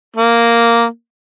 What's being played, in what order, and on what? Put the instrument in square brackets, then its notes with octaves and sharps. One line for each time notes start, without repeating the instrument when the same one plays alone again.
[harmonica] A#3